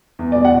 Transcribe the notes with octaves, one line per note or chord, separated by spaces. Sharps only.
E2
D5
B2
F#5